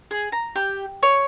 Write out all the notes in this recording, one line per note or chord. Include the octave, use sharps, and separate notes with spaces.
G#4
A#5
G4
C#5